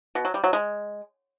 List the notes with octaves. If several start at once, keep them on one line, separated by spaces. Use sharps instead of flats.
B2
F#3
G3
F#3
G#3